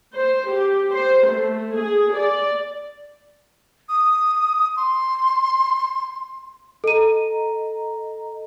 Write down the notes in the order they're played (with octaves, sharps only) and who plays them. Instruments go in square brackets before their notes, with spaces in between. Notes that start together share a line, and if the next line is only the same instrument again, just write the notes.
[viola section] C5
G4
C5
A3
G#4
D5
[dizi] D#6
C6
[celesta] A4 D#7 [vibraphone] D#5 A#5